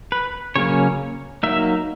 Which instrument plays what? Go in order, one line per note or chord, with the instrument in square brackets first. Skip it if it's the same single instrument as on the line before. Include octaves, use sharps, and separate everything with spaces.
[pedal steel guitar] B4
C#3 F#3 A#3 C#4 C#5
F#3 A#3 D#4 E5